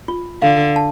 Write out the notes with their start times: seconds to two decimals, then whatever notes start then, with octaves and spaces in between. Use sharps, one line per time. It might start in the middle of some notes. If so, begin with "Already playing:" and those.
0.08 F4
0.42 D3 F5
0.76 A5